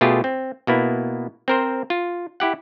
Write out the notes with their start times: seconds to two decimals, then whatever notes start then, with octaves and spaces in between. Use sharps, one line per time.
0.01 B2 A3 F4 G4 G#4
0.24 C4
0.67 B2 A#3 B3 E4
1.48 C4 A#4 C5
1.90 F4
2.40 E4 G4 F#5